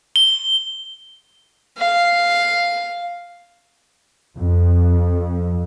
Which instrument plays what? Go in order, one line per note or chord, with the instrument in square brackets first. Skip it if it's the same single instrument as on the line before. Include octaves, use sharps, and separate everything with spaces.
[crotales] G7
[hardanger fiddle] F5
[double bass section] F2